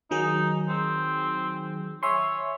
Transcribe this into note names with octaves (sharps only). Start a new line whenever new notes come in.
D#3 F#3 D#4 G#4
C4
C#5 E5 G#5 C6